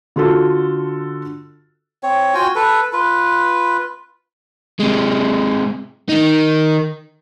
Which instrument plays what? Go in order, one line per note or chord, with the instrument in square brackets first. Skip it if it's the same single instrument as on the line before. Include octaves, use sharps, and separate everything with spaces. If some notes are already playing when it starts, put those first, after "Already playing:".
[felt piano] D3 F4 F#4 A4
[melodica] C4 C#5
F4 F#4 G5 G#5
A4 B4
F4 B4
[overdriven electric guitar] C3 G#3
D#3 D#4